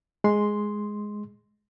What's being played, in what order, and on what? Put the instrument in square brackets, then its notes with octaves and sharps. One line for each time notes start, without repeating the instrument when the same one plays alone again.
[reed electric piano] G#3 C6